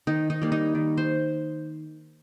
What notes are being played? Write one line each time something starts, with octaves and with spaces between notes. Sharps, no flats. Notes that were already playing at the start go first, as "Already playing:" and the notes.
D#3 D#4
D#4
G3 A#3
D#4
D#3
C5